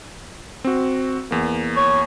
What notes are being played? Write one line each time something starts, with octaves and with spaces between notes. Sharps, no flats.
C4 F#4
E2 A#3
C#5